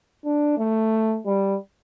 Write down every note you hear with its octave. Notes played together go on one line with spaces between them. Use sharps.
D4
A3
G3